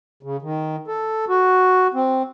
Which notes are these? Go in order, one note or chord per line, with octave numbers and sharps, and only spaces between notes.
C#3
D#3
A4
F#4
C4